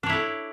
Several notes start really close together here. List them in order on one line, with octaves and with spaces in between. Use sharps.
D4 C#5 E4 A4